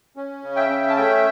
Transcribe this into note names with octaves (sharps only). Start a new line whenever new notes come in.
C#4
C#3
E5 G5
C#4
A5
A3 E5 G5